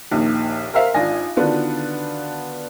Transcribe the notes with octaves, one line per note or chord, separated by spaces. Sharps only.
A#1 D#2 A#2 D#3
A#4 C5 E5 F5
G#1 D4 F4 G#5 A#6
D3 D#3 B3 D4 F4 F#4